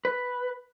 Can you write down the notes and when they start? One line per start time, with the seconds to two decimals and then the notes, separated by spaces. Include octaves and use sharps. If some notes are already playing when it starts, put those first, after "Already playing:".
0.05 B4